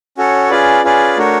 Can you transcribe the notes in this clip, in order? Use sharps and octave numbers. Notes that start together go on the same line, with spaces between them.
C#4 F#4 A4 C#5
C#4 F4 G#4 B4 D5
C#4 F4 G#4 B4 D5
A3 D4 F#4 A#4 C#5